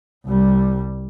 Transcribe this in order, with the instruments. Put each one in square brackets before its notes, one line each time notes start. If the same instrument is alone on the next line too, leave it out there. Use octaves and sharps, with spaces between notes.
[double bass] C2 G3